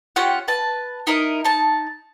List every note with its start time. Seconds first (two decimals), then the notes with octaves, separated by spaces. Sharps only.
0.16 C#4 F4 G4 F#5
0.48 B4 A5
1.07 D#4 E4 A#4 D#5
1.44 D#4 A5